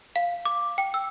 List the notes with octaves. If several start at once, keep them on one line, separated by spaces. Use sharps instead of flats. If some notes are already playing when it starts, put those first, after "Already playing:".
F5
D6
G5
E6